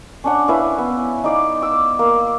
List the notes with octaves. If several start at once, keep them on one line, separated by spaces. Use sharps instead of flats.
C#4 D4 F#5
C#4 E4 B4 F5
B3
D#4 D5 F5
D6 E6
A#3